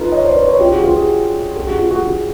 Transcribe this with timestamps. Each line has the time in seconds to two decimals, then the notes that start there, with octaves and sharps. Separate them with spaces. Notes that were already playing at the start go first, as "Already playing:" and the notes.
Already playing: D#4 F4 A4 B4
0.12 C#5 D#5
0.24 C5 D5
0.36 B4 C#5
0.48 B4 C#5
0.60 F4 G4
0.72 F#4 G#4
0.84 F4 G4
0.96 F#4 G#4
1.56 G4 A4
1.67 F#4 G#4
1.79 F4 G4
1.91 F#4 G#4
2.03 F#4 G#4